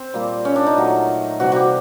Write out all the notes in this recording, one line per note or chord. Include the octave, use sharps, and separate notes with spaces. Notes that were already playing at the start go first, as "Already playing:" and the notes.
Already playing: C4
A#2 G3 A#3
C#4
D4
D#4
A#2 F#3 A3
C3 E3 G3 A#3 F#4
F#4 G4